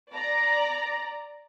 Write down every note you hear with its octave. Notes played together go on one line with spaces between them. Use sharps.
D5 A#5